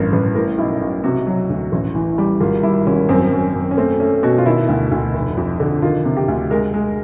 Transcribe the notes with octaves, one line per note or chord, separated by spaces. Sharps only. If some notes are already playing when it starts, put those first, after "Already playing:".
Already playing: A1 G2 A#4
A1 B4
A2 A#4
B1 E4
B1
C3 F#4
F#3
D2
A1
E3
G3
G#1 F4
G3 E4
G#1 C#4
F#2 C4
F#2
F#2
C#4
A3 C4
A3 C#4
B2 F#4
F4
D#3 E4
D2
D2
F1
F2
D3
D#3 F4
C3
G4
D2
G#3 A#4
G#3